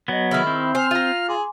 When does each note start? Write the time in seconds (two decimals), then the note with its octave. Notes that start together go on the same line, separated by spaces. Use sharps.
0.08 F#3 B3 D#5 A#6
0.31 D#3 E4 G#4 F6
0.47 C4
0.75 C5 G#5 F6
0.91 F4 A#5 D#7
1.28 G#4 G#5 C6 D6